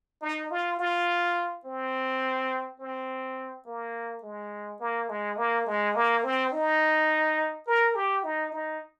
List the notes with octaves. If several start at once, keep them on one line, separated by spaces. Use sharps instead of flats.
D#4
F4
F4
C4
C4
A#3
G#3
A#3
G#3
A#3
G#3
A#3
C4
D#4
A#4
G4
D#4
D#4